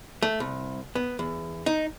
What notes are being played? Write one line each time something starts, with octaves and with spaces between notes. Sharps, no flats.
A3
C2
B3
E2
D#4